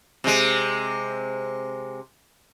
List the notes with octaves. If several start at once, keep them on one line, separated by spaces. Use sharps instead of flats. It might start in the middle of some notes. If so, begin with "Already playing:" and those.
C3 G#3